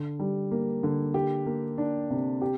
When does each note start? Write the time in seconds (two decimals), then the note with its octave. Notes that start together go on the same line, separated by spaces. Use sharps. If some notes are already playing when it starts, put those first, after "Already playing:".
Already playing: D3
0.20 G3
0.51 A#3
0.83 D3
1.14 G4
1.46 A#3
1.78 D4
2.10 C3
2.42 G4